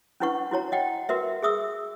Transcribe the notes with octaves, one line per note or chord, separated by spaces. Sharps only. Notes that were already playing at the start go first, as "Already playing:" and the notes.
C#4 D4 E4 B4 F#5 C#6
E4 F#4 C#5 A#5
D#5 F#5 G5
F#4 A#4 B4 E5
G#4 E5 D#6 E6